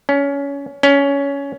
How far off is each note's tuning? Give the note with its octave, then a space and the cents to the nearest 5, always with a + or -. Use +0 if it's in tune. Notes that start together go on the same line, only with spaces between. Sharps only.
C#4 +20
C#4 +15